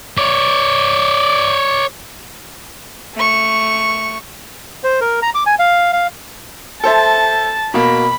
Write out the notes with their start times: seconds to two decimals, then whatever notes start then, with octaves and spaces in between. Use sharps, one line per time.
0.18 C#5 D5
3.15 A3 C#6
4.84 C5
5.01 A#4
5.22 A#5
5.35 D6
5.46 G#5
5.59 F5
5.93 F5
6.84 A4 C5 E5 A5
7.74 B2 A#3 B5